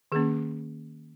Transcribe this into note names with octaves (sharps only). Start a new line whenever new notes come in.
D#3 A#3 C#4 G#4